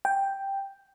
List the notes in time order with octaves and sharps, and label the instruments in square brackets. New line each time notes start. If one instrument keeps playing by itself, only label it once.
[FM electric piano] G5